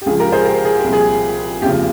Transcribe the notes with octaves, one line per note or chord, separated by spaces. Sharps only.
G4
C#2 C#3 F3 G#4
G4 A#4
G#4 C5
G4 A#4
G#4
G4
C2 A#2 F3
G#4
F1 D#2 C#3 F3 G4